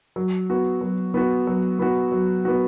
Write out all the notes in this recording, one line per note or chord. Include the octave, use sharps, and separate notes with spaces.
F#3
B3 F#4
F#3
B3 F#4
F#3
B3 F#4
F#3
B3 F#4